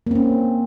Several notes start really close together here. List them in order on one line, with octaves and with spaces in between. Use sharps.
A#3 C4 C#4